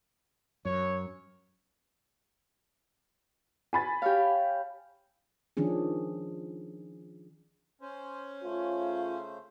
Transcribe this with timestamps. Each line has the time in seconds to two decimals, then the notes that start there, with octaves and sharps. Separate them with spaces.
0.65 F#2 C#5
3.73 G#5 B5 A6
4.02 G4 C#5 F5
5.57 D#3 F3 C#4 D4 G#4
7.81 C#4 C5
8.44 C#3 A3 F4 C5